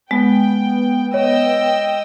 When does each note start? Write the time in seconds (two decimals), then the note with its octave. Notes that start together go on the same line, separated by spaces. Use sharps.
0.11 G#3 B3 G5
1.14 C#5 D#5 G5 E6